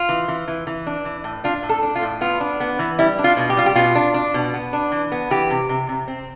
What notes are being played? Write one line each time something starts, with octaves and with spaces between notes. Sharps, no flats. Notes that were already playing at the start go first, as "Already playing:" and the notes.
Already playing: F4
E3
E3
E3
E3
D4
E3
A2
D4 F4
A2
A4
D4
F4
A2
B3 F4
D4
B3
E3
G3 E4
D4
F4
B2
G4
G3 F4
G4
B2 F4
D4
D4
B2
B3
D4
E3
B3
E3 G4
C3
C3
C3
C4